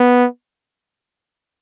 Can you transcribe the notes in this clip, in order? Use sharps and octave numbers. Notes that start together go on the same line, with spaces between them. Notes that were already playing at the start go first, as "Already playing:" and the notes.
Already playing: B3